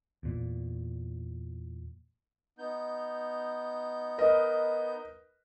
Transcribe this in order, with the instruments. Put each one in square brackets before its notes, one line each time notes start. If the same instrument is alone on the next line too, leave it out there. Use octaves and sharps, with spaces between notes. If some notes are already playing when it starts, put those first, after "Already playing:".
[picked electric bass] E2 A#2
[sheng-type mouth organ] B3 D#4 G6
[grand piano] A#4 B4 D#5